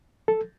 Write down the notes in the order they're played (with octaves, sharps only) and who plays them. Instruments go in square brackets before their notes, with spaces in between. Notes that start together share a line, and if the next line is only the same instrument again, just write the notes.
[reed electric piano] A4